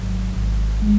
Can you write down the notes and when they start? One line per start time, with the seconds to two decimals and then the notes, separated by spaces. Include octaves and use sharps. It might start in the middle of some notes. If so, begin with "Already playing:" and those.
Already playing: G#1 F#3
0.35 G#1
0.82 G#3